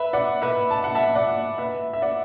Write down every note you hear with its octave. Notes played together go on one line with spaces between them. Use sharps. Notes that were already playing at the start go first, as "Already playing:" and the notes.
Already playing: B4 E5
D5 F#5
B4 E5
A5
F#5
E5 A5
D5 F#5
B4 E5
E5
D5 F#5